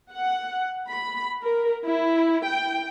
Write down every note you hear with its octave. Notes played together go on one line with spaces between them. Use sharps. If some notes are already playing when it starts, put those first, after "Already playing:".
F#5
B5
A#4
E4
G5